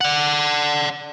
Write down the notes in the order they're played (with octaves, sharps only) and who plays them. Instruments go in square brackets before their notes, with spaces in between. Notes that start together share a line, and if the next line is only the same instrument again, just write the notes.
[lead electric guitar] D5 F#5